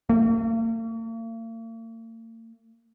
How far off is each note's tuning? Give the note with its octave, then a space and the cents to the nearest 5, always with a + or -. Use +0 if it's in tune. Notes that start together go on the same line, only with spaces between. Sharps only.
A#3 -45